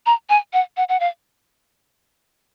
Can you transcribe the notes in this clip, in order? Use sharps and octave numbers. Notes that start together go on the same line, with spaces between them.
A#5
G#5
F#5
F#5
F#5
F5